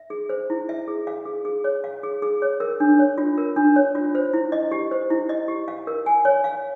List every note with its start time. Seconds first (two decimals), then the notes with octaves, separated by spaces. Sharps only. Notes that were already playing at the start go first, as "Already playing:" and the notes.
Already playing: E5
0.10 G#4
0.29 C5
0.50 E4
0.69 E5
0.88 G#4
1.07 F5
1.25 G#4
1.45 G#4
1.64 C#5
1.84 F5
2.03 G#4
2.22 G#4
2.42 C#5
2.60 A#4
2.80 D4
2.99 C#5
3.18 F4
3.38 A#4
3.56 D4
3.76 C#5
3.95 F4
4.15 C5
4.33 E4
4.52 D#5
4.71 G4
4.91 C5
5.10 E4
5.29 D#5
5.48 G4
5.68 F5
5.87 A#4
6.06 G#5
6.25 C#5
6.44 F5